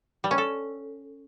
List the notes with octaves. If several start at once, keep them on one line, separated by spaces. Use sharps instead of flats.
G3
C#4
A4